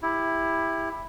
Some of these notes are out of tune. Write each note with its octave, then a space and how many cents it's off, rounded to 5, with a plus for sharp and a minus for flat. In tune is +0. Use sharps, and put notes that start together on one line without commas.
E4 +0 G4 +20